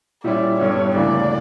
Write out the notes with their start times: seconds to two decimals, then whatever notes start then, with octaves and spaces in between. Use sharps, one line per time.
0.24 A#2 G3 C#4 E4 D5
0.59 G2 D3 G3 B3 C#5
0.95 D2 C#3 E3 A#3 D4 D5